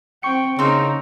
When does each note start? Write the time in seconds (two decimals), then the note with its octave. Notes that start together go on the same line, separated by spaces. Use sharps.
0.23 C4 G5 C#6 C#7
0.59 C#3 A#3 C4 D#4 A#4